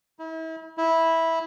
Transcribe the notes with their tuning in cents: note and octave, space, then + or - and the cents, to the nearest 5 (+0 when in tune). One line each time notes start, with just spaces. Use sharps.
E4 -40
E4 -10